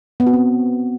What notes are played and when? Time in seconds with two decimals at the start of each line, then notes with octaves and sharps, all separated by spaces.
0.20 B3
0.27 F#4
0.33 C4